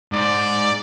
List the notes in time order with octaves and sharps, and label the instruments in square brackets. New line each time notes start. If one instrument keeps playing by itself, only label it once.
[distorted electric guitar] G#2 [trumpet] D5